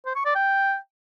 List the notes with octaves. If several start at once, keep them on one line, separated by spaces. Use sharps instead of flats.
C5
C#6
D5
G5